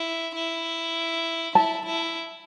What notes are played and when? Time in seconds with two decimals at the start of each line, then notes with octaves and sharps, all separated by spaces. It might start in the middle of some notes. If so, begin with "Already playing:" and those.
Already playing: E4
0.35 E4
1.55 E4 A5
1.86 E4